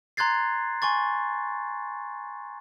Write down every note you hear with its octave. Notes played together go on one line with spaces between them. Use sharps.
A#5 C6 F#6 G#6 A6 C7
G#5 C6 C#6 A6